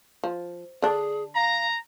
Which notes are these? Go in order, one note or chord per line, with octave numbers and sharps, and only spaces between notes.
F3
D3 D4 G#4
F5 A#5